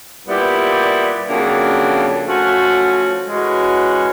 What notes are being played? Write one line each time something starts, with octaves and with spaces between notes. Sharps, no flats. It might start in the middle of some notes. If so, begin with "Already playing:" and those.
A#2 G3 B3 E4 G4
F2 C#3 F#3 A#3 D4
F3 A3 C#4 F#4
E3 G#3 C#4 F#4